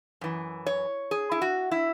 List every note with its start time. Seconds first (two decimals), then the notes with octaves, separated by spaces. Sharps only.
0.21 F#2 E3
0.66 C#5
1.11 G#4
1.31 E4
1.42 F#4
1.71 E4